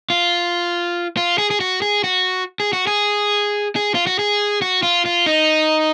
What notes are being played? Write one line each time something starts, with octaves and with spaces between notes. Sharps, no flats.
F4
F4
G#4
G#4
F#4
G#4
F#4
G#4
F#4
G#4
G#4
F4
F#4
G#4
F#4
F4
F4
D#4